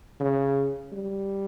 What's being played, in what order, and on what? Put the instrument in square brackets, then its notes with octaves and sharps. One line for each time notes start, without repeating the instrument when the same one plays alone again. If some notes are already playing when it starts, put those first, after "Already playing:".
[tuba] C#3
G3